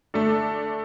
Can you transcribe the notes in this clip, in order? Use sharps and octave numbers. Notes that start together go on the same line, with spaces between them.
A3 D4 A4